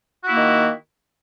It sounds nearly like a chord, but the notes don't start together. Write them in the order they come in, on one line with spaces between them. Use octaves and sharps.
F#4 E4 A#3 D#3